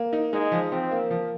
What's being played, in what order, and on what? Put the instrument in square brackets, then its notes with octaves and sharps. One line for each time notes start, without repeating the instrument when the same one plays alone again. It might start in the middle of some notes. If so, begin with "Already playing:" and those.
Already playing: [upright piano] A#3
D#4
[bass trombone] G#3 [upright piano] D#4
[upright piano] F3
[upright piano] F3 [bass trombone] C4
[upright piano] A#3
F3